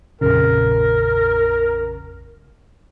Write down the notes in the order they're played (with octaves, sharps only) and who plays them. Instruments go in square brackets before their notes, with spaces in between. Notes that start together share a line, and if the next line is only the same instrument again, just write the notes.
[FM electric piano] A#1 F2 C#3 [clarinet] A#4